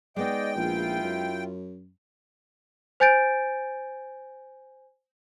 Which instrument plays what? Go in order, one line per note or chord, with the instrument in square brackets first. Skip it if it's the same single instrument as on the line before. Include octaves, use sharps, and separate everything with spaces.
[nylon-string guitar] G#3 B3 D#4 [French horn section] D5 D#5 [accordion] G5
[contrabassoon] A#1 [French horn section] E4 F4
[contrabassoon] F#2
[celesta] C5 G#5 G6 A6 D7